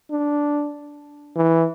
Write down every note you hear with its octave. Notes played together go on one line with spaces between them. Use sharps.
D4
E3